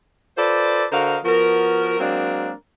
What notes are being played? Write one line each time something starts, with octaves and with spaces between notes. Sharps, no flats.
F4 A4 B4 C5 D5
D3 F#4 A#4 C5 D#5 F5
F3 B3 F#4 A#4
F#3 G#3 A#3 C4 D4 A#4